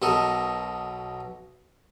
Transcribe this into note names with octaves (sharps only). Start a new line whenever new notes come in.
B1 B2 A4 A#4 D#5